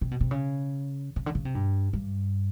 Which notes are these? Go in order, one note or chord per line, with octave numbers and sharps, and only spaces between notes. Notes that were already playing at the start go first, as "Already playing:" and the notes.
C3
B2
C3
C#3
C#3
D3
C#3
C3
G2
G2